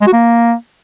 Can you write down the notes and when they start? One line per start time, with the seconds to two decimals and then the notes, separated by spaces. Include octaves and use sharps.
0.01 G#3
0.07 F#4
0.13 A#3